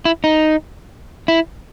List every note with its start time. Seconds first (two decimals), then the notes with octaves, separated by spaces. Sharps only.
0.05 E4
0.24 D#4
1.28 E4